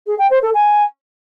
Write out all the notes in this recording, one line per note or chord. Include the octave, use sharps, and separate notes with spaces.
G#4
G5
C5
A4
G#5